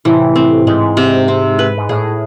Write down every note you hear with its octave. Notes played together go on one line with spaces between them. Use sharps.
A2 C3 E3
C4
G#2 G#3
C3
C4
B4
G#2
A2 G#4